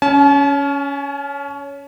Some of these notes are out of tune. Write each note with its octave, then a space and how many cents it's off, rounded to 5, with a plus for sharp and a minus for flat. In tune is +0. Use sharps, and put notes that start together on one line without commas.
C#4 +15 A5 -45